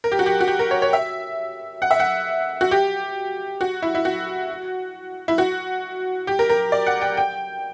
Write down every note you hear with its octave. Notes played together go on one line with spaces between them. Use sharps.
A#4
G4
F#4
G4
F#4
G4
A#4
C#5
C#5
E5
F#5
E5
F#5
F#4
G4
F#4
E4
E4
F#4
E4
F#4
G4
A#4
A#4
D5
F#5
G5
G5